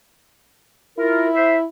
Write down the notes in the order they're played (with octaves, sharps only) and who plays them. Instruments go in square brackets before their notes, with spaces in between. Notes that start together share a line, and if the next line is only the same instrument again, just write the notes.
[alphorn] E4 [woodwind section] F4 A#4
[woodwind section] C5 E5